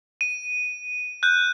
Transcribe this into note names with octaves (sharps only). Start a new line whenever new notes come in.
D#7
F#6 G6